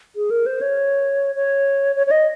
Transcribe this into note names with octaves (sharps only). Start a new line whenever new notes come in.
G#4
A#4
C5
C#5
C#5
C#5
C#5
D#5